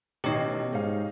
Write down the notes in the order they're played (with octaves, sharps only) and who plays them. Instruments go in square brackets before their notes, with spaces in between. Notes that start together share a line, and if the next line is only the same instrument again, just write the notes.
[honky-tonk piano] A1 D#3 C7 [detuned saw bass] B2 [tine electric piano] G4 C#5 D#5
[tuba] G#2 [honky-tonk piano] D#4 F5